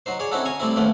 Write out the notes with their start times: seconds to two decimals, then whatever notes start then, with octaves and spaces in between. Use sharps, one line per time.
0.06 F#3 D#4 C5
0.19 G#4 C#5 D5
0.32 C4 C#4 D#4 E4 F#4 A4
0.45 C#5 G#5 A#5 C#6 D#6
0.60 G3 A3 C4 E4
0.76 D#2 F3 A3 B3 C#4